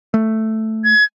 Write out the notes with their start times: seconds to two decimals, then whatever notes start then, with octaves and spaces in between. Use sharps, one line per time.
0.14 A3
0.84 G#6